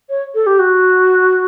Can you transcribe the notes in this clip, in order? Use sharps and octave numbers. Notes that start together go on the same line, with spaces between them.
C#5
A4
G4
F#4